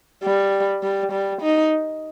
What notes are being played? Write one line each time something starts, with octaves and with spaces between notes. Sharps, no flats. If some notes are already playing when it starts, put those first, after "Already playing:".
G3
G3
G3
D#4